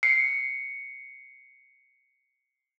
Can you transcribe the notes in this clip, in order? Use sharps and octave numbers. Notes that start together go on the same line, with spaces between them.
C7 C#7